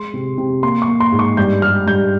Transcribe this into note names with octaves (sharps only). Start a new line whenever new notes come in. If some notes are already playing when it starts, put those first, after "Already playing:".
Already playing: G#3 C6
C3
C3
A#3 C6
C#6
A#3
C6
G#2
C#6
G2 G6
G3 F6
G2 G6